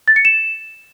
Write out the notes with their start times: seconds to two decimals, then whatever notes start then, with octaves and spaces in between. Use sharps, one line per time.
0.08 A6
0.16 C#7
0.25 E7